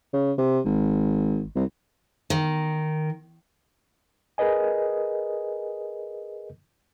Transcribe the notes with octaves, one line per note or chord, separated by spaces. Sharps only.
C#3
C3
G#1
C2
D#3
G#4 A#4 B4 D#5 G#5